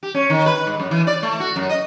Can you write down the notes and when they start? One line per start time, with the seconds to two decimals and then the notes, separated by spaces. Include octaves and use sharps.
0.03 G4
0.14 C#4
0.30 D#3
0.46 B4
0.67 G#2
0.80 F#2
0.91 E3
1.07 D5
1.23 A3
1.40 F#4
1.56 F#2
1.69 D#5